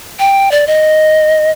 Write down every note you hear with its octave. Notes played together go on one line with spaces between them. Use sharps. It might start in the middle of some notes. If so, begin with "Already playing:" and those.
G5
D5
D#5